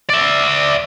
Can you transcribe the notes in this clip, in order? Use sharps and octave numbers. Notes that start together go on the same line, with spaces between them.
D5 E5